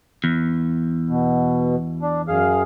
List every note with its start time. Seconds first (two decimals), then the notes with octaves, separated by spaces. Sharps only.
0.24 E2
1.09 B2
2.02 D4
2.28 F#2 G#4 F5